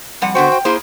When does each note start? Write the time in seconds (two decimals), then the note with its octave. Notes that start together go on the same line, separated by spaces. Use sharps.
0.22 F2 G3 F#5
0.35 D3 B3 F#4 C5 G5
0.52 G5
0.65 A#3 E4 G#4 C5 C6